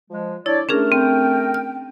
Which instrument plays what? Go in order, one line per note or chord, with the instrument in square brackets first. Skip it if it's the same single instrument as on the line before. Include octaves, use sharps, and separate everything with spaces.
[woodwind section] F3 G#3
[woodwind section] D4 C#5 D5 [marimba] E4
[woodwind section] A3 A#4 [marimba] C#4 D4 G#4
[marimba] C4 [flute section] G5
[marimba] F6